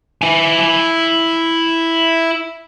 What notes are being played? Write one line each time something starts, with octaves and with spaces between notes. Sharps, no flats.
E4 G#5